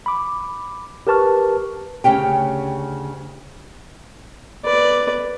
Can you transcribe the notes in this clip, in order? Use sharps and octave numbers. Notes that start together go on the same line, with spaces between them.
B5 D6
G4 A#4 B4 A5 C#6 F6
D2 C#3 C#4 G4 G5
B4 D5